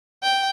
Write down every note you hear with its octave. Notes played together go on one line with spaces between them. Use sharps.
G5